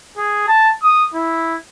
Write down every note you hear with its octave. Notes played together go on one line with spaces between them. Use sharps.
G#4
A5
D#6
E4